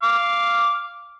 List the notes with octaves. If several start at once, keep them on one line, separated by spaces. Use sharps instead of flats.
F5 D6